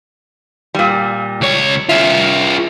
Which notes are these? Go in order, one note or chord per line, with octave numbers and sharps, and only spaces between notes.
A#2 G3
C#2 C#5
F4 G#4 E5